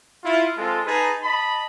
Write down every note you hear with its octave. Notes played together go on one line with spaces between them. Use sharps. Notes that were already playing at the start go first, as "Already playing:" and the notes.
E4 F4
G#3 C4 F4 A4
D#4 G#4 B4 A5 A#5
D#5 A5 B5